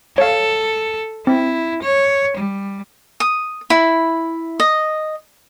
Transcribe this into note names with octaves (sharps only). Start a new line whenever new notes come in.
A4 C#5 F5
C4 E4
C#5
G3
D#6
E4
D#5